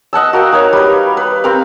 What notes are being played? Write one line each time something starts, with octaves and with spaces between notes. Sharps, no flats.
D#5 F#5 A5 E6
F#4 A#4 F5 G5
D#4 A#4 C#5
G3 B4
B4
C4 G4 A#4 F5